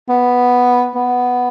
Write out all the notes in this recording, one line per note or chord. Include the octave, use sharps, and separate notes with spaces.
B3
B3